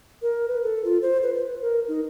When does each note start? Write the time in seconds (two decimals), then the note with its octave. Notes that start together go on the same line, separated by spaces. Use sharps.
0.22 A#4
0.48 B4
0.63 A4
0.85 F4
1.02 C5
1.23 B4
1.36 B4
1.62 A#4
1.88 D#4